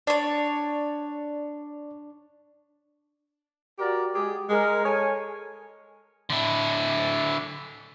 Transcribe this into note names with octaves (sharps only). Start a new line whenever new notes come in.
D4 C#5 D5
F#4 G4 A#4 D5
G#3 G4 G#4
G#3 A#4
A4 C#5 G#5
D3 E4